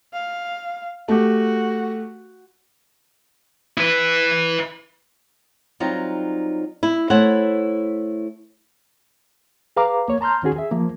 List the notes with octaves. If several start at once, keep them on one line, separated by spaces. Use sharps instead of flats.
F5
A3 F#4 G4
E4 B4
F#3 G3 C4 D#4 F4
E4
A3 E4 C5 C#5 F#5
G#4 B4 F5 A#5 D6
A#3 C#5
A5 A#5 C6 F6 G6
D#3 C#4 F#4 G#4
G#4 E5
F3 A#3